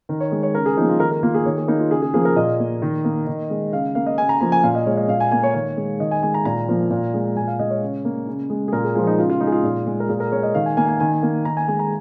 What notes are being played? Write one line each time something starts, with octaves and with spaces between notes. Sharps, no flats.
D#3 A#4
C#5
G#3
C#5
C#3 A#4
G#4
F3 A#3 D#4
F4
D#3 A#4
A#4
A#3 F4
G#4
D#3 C#5
G#4
A#3 D#4
F4
C#3 G#4
G#4
F3 A#3 G#4
A#4
A#2 D#5
A#3
D#3
A#3
D#3
G#3
C#3 F5
A#3 F5
D#5
C#3 G#5
A#5
F3 A#3 A#5
G#5
A#2 F5
D#5
G#3 C#5
D#5
A#2 F5
G#5
A#3 G#5
C#5
D#3 C#5
G#3
D#3 D#5
G#5
G#3 G#5
A#5
A#2 A#5
F3 A#3
A#2
G#3
A#2 G#5
F5
G#3 D#5
C#5
C#3
A#3
C#3
G#3
G#4
A#2 A#4
G#4
F3 G#3 F4
D#4
C#3 F4
F4
G#3 D#4
G#4
F4
A#2
G#3
A#4
A#2 G#4
A#4
G#3 C#5
D#5
D#3 F5
G#5
A#3 G#5
G#5
D#3 G#5
A#3
D#3 A#5
G#5
G#3 G#5
A#5